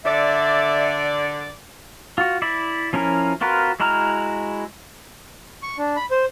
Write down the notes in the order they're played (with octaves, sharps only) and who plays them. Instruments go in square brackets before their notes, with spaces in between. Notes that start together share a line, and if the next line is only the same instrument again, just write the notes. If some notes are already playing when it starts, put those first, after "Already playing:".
[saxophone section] D3 D5 [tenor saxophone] E5
[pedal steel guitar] F4 F#4
E4 D5 E5
F3 C#4 E4 A#4
C4 F4 F#4 A#4 B4
G#3 E4 F#4 A#5 F6
[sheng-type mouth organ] C#6
D4
B5
C5